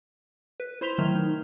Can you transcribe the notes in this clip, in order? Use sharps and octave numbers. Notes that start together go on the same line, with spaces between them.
B4
E4 C5 C6 B6 F7 G7
D#3 F#3 A3 F6 G#6 F7
D#4